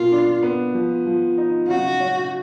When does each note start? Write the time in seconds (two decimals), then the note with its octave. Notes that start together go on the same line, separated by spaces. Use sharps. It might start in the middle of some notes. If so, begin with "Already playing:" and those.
Already playing: B2 A#3 F4
0.12 D4
0.43 B3
0.74 F3
1.06 F3
1.38 D#4
1.68 C#3 F#4
2.00 C#4